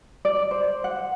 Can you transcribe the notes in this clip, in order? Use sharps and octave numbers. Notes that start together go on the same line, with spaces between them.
D5
C5
F#5